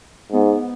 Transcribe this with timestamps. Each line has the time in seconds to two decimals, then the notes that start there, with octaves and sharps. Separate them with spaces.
0.33 G#2 B3